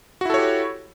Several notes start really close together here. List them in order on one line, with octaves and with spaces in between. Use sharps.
F#4 E4 A4 C#5 G4